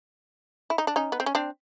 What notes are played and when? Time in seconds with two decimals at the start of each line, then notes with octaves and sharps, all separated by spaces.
0.70 E4
0.78 D#4
0.87 D4
0.96 C#4 D#4
1.12 B3
1.20 C4
1.26 C#4
1.35 C4 D4